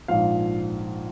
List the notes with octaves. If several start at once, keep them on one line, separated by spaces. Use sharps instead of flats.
A#1 G#2 F3 F5